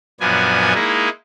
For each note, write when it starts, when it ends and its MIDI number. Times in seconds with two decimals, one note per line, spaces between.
0.20 0.74 42
0.20 0.74 46
0.20 0.74 53
0.20 0.74 59
0.20 0.74 62
0.20 0.74 80
0.74 1.09 56
0.74 1.09 58
0.74 1.09 63
0.74 1.09 64